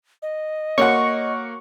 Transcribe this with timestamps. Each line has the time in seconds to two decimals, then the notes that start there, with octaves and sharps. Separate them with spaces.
0.22 D#5
0.78 A#3 F#4 A4 C#5 F#5 C#6